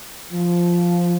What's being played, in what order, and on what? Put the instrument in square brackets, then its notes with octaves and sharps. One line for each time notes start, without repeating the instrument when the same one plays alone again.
[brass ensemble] F3